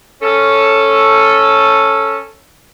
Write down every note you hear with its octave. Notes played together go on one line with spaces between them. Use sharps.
C#4 A4